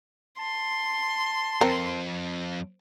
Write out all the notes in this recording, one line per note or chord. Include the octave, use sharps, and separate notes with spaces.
A5 C6
F2 C4 A#4